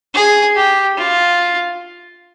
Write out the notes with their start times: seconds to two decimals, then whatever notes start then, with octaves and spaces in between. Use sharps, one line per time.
0.14 G#4
0.55 G4
0.98 F4